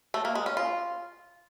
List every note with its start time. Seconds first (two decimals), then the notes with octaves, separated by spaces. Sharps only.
0.14 A3
0.25 A#3
0.35 G#3
0.46 C#4
0.57 F4